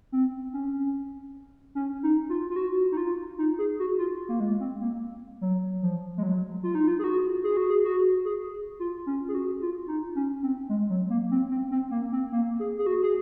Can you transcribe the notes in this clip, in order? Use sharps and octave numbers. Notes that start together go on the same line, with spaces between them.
C4
C#4
C#4
D#4
F4
F4
F#4
D#4
F4
D#4
G#4
F#4
F4
A#3
G#3
C4
A#3
F#3
F3
G#3
F#3
F4
D#4
F4
G#4
F#4
G#4
F#4
G#4
F#4
G#4
F4
C#4
G#4
F#4
F4
D#4
C#4
C4
G#3
F#3
A#3
C4
C4
C4
A#3
C4
A#3
G#4
G#4
F#4
G#4